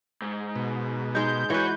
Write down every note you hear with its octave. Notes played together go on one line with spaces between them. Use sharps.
G#2
B2
G#3 D#4 G6
E3 F#4 B4 C#5